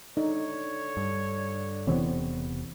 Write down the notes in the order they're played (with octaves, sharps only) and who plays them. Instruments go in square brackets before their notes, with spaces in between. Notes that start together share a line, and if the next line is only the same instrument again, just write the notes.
[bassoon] D3 [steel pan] D#4 [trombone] C#5
[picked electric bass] G2
[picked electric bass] E1 C3 B3 [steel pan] E3 C4 C#5